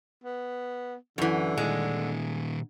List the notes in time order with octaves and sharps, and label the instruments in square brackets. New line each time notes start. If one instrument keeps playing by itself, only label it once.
[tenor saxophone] B3
[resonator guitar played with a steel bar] F#2 E3 [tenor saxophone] D3
[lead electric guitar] A#2 D#3 [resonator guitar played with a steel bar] G#3